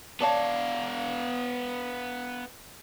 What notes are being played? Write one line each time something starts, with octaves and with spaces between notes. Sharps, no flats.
B3 C#5 D5 F5 A5